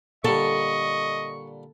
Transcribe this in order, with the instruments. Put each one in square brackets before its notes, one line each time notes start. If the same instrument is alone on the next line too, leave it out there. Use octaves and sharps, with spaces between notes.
[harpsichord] A#2 D3 G3 [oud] A4 [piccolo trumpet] D#5 [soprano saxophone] C#6